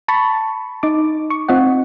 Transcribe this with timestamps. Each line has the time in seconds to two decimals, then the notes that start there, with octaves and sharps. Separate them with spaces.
0.08 A5 B5 C#6
0.83 D#4 D6
1.30 C#6
1.48 C4 F4 D#5 F#5